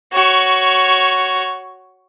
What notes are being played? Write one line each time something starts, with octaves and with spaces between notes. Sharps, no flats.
F#4 C#5